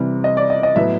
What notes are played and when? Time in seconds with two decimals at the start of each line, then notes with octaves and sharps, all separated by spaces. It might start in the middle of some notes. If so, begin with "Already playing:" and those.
Already playing: C3 E3 G3
0.24 D#5
0.37 D5
0.50 D#5
0.63 D#5
0.76 A2 F#3 B3 E5